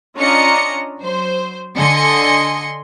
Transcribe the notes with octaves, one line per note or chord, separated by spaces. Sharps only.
C#4 D4 F4 D#5 A#5 C#7
F#3 C5
D3 D#5 G#5 C6 C#7